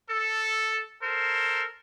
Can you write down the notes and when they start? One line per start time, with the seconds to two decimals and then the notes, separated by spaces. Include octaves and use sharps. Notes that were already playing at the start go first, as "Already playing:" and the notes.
0.10 A4
1.03 A4 A#4 C5